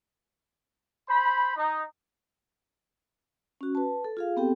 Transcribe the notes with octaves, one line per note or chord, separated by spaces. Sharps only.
C5 B5
D#4
C#4 F#4
B4 A5
A4
F4 G#4 F5
B3 C4 G4 A4 G5